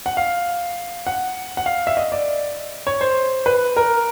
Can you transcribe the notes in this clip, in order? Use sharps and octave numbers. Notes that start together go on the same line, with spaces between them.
F#5
F5
F#5
F#5
F5
E5
D#5
D5
C#5
C5
B4
A#4